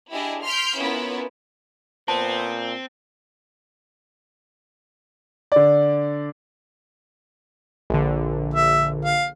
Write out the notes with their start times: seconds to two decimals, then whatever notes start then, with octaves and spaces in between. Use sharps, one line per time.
0.11 D4 E4 G4 G#4 D#5
0.44 C6 F6 G6 B6 D7
0.79 B3 C#4 E4 F4 A#4 B4
2.08 A#2 B3 C4 C5 A5
5.52 D3 D5
7.90 A#1 D3
8.54 E5
9.05 F5